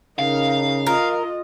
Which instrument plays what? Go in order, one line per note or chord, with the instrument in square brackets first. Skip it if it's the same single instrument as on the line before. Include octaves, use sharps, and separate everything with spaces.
[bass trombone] C#3 [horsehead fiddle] D#4 A#4 [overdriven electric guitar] F5
[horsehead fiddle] F4 D#5 [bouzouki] A#4